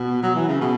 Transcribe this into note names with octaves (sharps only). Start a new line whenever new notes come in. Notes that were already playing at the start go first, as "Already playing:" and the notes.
Already playing: B2
F#3
E3
C#3
B2